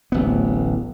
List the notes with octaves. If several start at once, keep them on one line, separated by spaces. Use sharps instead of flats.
D1 A1 B3